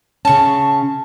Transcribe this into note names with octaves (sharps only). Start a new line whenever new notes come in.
C#3 C#4 A5 C#6